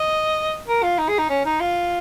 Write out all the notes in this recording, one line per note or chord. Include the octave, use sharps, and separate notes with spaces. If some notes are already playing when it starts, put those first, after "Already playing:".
Already playing: D#5
A#4
F4
D#4
G#4
D#4
C#4
D#4
F4